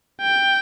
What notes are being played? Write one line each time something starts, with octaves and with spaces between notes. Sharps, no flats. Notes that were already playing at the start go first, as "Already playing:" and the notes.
G5